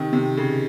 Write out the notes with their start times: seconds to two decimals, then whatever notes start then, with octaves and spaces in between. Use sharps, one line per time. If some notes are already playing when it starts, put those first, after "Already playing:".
Already playing: C3 D#3
0.13 C3
0.37 C#3